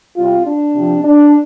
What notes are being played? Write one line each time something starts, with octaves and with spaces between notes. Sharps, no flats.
C3 G3 F4
D4
C3 F3
D4